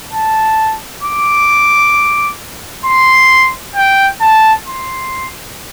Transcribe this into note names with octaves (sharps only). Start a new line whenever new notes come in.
A5
D6
C6
G5
A5
C6